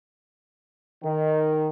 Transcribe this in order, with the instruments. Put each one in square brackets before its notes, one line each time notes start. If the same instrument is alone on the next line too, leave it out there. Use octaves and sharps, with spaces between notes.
[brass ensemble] D#3